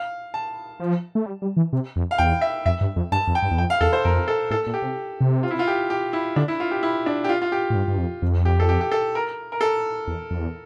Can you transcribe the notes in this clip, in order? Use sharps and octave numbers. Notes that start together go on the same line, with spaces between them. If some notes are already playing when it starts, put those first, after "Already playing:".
Already playing: F5
A5
F3
A3
G3
G3
E3
C3
F2
F5
E2 G5
E5
F2 E5
G2
F2
G2 A5
F2
G5
G2
E2
F2 G5
F5
E2 A4
C5
F2 A#4
A4
A2 A4
A#2
G4
C3
C3
F4
E4
F4
G4
G4
E4
D3 D4
E4
F4
G4
E4
D4
G4
F4
F4
G4
A2
G2
G2
F2
F2
G4
A4
G4
G4
A4
A#4
A#4
A4
E2
F2
E2